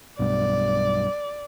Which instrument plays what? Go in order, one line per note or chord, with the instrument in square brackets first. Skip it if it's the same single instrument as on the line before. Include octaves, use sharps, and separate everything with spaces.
[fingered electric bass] B1 G2 B2 [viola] D5